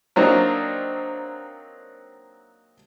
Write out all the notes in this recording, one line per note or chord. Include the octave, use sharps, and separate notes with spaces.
F#3 A#3 C4 D4 D#4